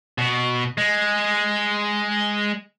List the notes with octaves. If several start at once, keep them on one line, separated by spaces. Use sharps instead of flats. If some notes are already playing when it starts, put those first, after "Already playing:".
B2
G#3